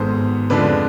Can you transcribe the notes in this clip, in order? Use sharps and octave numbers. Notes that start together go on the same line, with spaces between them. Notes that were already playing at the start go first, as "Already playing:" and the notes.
Already playing: G#1 G#2 G#3 B3 A4 C5
F2 D3 F3 G#3 B4 D5